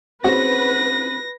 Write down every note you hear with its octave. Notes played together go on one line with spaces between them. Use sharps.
C4 C#4 F#4 G#4 B4 A#6